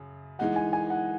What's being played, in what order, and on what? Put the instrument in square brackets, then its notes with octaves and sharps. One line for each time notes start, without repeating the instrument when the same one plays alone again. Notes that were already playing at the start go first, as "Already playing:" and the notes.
Already playing: [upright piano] F#2 C#3
[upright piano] E3 G#3 D#4 [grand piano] F#5
[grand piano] G#5
G#5
F#5